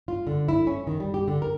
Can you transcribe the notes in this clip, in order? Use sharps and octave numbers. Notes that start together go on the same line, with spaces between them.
F4
D3
E4
C#4
D#3
G3
G4
D3
A#4